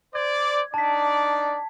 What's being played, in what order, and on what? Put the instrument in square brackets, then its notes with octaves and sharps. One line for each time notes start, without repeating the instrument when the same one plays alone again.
[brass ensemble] C5 D5 [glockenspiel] G#6
[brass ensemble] D4 D#4 D5 [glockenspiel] A5 B6